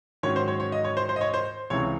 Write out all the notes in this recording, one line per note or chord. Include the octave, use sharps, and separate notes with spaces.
G#2 D#3 F#3 C#4 C#5
C5
C#5
C#5
D#5
C#5
C5
C5
D#5
C#5
C5
C#2 C3 E3 C4 C#5